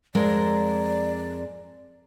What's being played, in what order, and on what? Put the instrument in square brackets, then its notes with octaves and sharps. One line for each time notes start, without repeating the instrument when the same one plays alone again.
[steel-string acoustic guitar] F2 G#3 A#4 [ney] D5